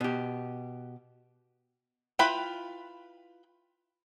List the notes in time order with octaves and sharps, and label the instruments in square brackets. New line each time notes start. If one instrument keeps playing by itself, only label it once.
[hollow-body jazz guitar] B2 G4
[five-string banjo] E4 F4 B4 G5 B5